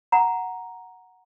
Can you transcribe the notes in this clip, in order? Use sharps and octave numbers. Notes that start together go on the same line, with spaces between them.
F#5 A#5